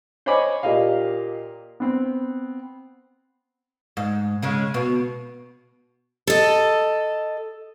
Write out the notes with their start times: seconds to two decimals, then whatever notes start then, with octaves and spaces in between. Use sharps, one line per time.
0.26 C5 C#5 D#5 G#5 B5 D6
0.63 A#2 A#3 G4 D#5 F5
1.80 B3 C4
3.97 G#2
4.43 C#3 G#3
4.74 B2
6.27 A4 D#5